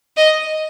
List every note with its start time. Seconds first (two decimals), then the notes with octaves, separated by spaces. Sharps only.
0.17 D#5